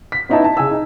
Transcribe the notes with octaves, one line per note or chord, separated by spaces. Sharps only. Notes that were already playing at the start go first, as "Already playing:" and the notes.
B6
B3 C#4 D#4 E4 E5 A5
A5
C#3 G#5 E6
D#4